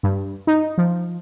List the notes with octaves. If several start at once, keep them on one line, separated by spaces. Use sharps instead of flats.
G2
D#4
F3